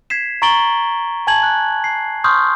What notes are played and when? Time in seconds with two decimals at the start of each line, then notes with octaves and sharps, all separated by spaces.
0.10 G#6 B6 C7 E7
0.42 A#5 C#6 A6 D7 F#7 G7
1.27 G#5 A5 G#6 F#7
1.43 F#6
1.84 C7
2.24 C6 C#6 D#6 F6 G6